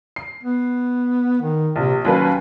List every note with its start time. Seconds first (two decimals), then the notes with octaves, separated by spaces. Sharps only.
0.16 C7
0.43 B3
1.42 D#3
1.76 A#1 C3
2.05 D#2 F#3 C#4 B4